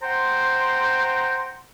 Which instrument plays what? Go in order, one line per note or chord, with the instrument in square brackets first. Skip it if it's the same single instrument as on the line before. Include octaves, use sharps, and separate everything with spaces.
[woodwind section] C5 F#5 G5 A#5 C6